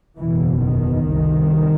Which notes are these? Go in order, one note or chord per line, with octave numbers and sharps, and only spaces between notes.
F#1 E2 B2 E3
D#3
C2 C3